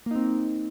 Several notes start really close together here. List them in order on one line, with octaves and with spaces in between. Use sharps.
A#3 D#4 C4